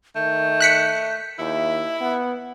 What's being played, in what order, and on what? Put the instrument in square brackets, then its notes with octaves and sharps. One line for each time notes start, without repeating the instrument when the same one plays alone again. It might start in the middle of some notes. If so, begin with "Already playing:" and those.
[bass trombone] D#3 [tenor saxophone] A3 [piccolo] G6
[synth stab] F#6 B6 C#7
[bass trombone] D#2 [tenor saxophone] E4 [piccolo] E5
[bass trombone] B3 [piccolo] F#5